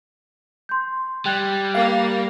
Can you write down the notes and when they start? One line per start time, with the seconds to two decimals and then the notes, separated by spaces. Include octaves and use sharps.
0.69 C6 G6
1.25 G3 G5 F#6 G#6
1.74 A#3 A#4 F5